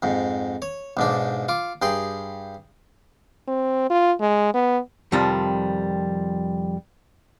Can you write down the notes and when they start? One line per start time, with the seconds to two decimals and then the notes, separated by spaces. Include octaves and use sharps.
0.02 F2 G#2
0.62 C#5
0.97 B1 G#2 D4
1.48 F4 D6
1.82 G2 G#4 G5 C6
3.48 C4
3.90 F4
4.20 G#3
4.54 B3
5.12 F2 C3 D#3 F3 G3